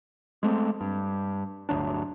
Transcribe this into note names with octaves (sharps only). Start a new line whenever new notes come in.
G#3 A3 C4
G2
G1 D2 F#3 D4